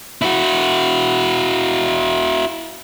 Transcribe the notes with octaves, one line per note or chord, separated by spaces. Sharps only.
E4 F#4